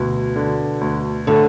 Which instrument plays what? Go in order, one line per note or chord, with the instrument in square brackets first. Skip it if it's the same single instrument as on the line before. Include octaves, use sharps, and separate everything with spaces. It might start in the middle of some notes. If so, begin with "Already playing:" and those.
Already playing: [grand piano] D2 [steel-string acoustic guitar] B2
[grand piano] D3
D2
[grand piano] A2 [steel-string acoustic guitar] D3